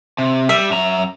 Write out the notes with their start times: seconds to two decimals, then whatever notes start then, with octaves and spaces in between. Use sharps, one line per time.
0.18 C3
0.49 G3 E5
0.70 F#2 A#5